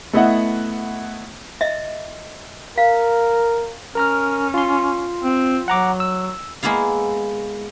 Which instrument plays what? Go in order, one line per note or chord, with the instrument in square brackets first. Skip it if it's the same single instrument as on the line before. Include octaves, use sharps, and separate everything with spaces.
[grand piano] A3 B3 E4 D#5 E5 F#5
[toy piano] D#5 E5
[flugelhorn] A#4 [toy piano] F5
[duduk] C#4 [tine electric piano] A#4 A#5 F6
[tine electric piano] F4 C6
[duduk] C4
[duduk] F#3 [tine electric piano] F#5 A#5 D6
[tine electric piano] E6
[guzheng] G#3 A#3 B3 E4 F5